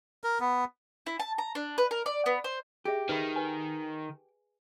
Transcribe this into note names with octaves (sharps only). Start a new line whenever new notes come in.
A#4
B3
E4
A5
A#5
D4
B4
A#4
D5
B3
C5
G4 G#4 E5
D#3 B4 E5 B5
B4 G#5